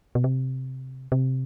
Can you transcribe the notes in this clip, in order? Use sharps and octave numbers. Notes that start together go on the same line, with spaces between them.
B2
C3
C3